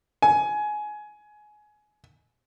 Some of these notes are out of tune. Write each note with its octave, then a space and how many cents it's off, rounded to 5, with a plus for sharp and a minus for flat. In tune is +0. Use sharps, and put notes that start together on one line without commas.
G#5 +20